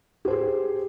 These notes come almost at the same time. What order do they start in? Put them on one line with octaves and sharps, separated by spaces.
G4 C5 G#4